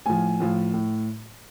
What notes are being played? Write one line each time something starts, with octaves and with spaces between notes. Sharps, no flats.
A2 F3 G#5
A2 F3
A2